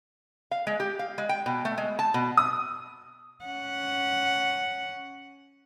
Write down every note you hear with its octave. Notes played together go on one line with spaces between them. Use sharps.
F5
G#3
G4
F5
G#3
G5
B2
A3
G#3
A5
B2
D#6
C#4 F#5